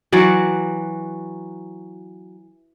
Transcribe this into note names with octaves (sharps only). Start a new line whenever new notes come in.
E3 F#3 F#4 D5